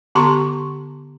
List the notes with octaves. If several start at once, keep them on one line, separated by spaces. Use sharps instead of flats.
D3 B3 G4 A#5 C6 C#6